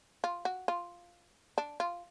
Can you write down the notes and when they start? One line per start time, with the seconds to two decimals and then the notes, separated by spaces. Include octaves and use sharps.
0.24 F4
0.45 F#4
0.68 F4
1.58 D4
1.80 F4